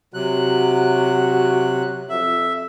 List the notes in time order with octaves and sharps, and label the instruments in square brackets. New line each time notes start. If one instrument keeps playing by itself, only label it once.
[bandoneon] C3 F#3 F#6 [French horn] F#4
[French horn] F2 [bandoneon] E5